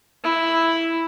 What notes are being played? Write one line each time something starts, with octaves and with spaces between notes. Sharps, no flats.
E4